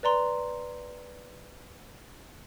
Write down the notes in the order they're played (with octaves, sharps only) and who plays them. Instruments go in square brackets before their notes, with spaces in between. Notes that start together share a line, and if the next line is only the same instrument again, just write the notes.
[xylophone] B4 D5 A#5 C6